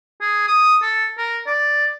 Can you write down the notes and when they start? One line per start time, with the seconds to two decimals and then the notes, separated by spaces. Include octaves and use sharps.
0.21 G#4
0.47 D#6
0.82 A4
1.18 A#4
1.46 D5